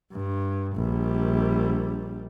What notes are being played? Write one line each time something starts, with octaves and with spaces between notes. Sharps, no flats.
G2
A#1 G3